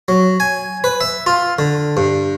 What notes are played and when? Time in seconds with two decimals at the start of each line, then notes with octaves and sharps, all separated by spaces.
0.08 F#3
0.40 G#5
0.84 B4
1.01 E5
1.26 F4
1.59 D3
1.97 G2